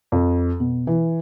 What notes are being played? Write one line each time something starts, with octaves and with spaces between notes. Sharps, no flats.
F2
B2
E3